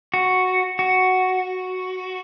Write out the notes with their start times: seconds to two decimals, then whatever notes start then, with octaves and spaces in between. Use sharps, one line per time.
0.14 F#4
0.79 F#4